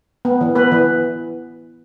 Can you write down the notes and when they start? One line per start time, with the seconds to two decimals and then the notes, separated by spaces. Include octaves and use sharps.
0.25 B3
0.41 E3
0.55 B3 B4
0.72 E3